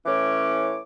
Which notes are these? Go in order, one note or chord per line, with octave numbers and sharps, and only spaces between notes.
A2 E3 C#4 C#5 D6